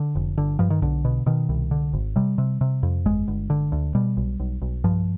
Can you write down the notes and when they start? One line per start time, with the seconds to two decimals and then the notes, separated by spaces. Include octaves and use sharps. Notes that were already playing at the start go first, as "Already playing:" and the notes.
Already playing: D3
0.15 F1
0.38 G1 D3
0.59 G2 F3
0.70 D#3
0.82 B1 D3
1.05 B2
1.26 B2 D#3
1.49 C2
1.71 D3
1.93 G#1
2.16 C3 G3
2.38 C3
2.61 C3
2.83 F2
3.06 G1 G#3
3.28 G1
3.50 D3
3.72 D2
3.95 B2 G3
4.17 B1
4.40 B1
4.62 B1
4.84 G2 F3